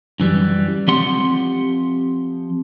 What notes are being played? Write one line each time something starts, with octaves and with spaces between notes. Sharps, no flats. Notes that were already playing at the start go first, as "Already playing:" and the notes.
F#2 E3 G3
F3 C4 G4 F#5 C6